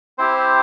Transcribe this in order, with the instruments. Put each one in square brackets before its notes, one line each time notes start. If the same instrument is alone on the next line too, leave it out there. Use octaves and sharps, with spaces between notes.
[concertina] C4 E4 G4 C5